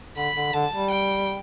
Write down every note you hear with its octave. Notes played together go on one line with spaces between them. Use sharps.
D3 B5
D3
D3 A5
G3
G5